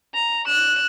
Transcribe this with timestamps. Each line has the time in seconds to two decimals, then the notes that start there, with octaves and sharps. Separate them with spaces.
0.14 A#5
0.46 F#6 E7